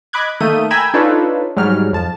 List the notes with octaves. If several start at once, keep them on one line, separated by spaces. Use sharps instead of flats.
D#5 B5 D6 F#6 G#6
D#3 A3 A#3 D#6 G6 D#7
G5 G#5 A#5 B5 E6 G#6
D4 D#4 F4 A4 B4 C#5
G#2 F#3 G3 F6
F2 A5